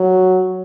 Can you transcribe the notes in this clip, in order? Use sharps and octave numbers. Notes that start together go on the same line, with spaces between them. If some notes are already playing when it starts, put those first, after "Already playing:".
Already playing: F#3